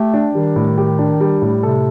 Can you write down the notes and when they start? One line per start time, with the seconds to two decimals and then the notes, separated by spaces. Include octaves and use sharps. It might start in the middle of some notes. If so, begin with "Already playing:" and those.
Already playing: A3 G4
0.14 D4
0.35 D#3 G3
0.56 A2
0.78 G4
0.99 D4
1.20 G3
1.42 A2
1.62 C3 A4